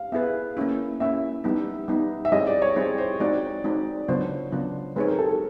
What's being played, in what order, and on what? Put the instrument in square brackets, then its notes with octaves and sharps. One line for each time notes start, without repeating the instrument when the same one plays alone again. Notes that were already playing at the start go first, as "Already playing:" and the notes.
Already playing: [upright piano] F5
[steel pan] B3 E4 G#4 B4 [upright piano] E5
[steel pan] A#3 C#4 E4
[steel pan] A#3 C#4 E4 [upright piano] E5
[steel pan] G3 B3 D#4
G3 B3 D#4
[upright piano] E5
[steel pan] G3 C4 E4 G#4 C#5 [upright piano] D#5
[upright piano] D5
C#5
[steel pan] G3 C4 E4 G#4 C#5 [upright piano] C5
[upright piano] C5
[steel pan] G#3 C4 D#4 F#4 [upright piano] D5
[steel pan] G#3 C4 D#4 F#4
[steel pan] C#3 F#3 B3 D4 F4 [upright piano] C5
[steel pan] C#3 F#3 B3 D4 F4
[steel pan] G#3 C4 D#4 G#4 C#5 [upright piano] B4
[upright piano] A#4
A4
A4